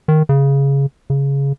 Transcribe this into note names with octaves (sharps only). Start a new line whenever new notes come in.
D#3
C#3
C#3